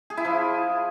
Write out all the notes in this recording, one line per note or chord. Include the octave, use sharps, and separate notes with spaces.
G#4
E4
F3